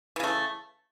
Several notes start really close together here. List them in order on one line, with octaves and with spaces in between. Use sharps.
E3 C#3 A3